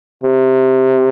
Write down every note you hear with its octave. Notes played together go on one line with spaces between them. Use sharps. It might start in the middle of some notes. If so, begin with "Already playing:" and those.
C3